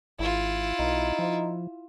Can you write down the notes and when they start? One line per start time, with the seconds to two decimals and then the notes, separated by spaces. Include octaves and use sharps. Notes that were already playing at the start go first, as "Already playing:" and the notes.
0.19 G#1 E4 F4
0.79 B1 D#4
1.19 F3